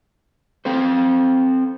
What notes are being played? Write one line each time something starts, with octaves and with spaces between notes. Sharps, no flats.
C4 A4 C5